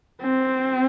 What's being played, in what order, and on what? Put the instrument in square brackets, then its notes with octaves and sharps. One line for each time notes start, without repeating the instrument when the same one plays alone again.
[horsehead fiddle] C4